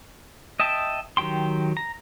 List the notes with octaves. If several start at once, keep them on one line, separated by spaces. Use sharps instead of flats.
D#5 E5 G5 A5
D#3 F#3 G4 G5 C6
A#5